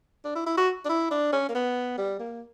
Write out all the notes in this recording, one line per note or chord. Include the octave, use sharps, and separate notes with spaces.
D4
E4
E4
F#4
D4
E4
D4
C#4
A#3
B3
G3
A#3